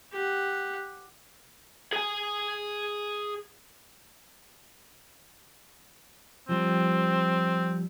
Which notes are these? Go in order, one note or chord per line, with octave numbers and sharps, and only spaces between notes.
G4 F#5
G#4 G#5
F3 G3 C4